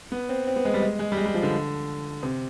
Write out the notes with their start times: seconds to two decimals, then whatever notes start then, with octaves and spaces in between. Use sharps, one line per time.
0.12 B3
0.29 C4
0.47 C4
0.56 B3
0.65 G#3
0.74 G3
0.82 G#3
0.99 G#3
1.12 G3
1.17 G#3
1.26 G3
1.34 F3
1.43 D3
2.23 C3